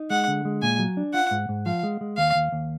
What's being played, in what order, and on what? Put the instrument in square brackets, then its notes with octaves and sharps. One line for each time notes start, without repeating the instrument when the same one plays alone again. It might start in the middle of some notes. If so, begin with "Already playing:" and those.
Already playing: [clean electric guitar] D#4
[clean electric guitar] G#3 [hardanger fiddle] F#5
[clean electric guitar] D3
G#3
[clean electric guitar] A#2 [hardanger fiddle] G#5
[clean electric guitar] F#3
D4
[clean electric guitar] F4 [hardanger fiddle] F#5
[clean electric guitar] G#2
G#2
[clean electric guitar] F3 [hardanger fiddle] F5
[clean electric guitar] G#3
G#3
[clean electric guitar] D#2 [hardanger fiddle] F5
[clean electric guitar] D#2
D#2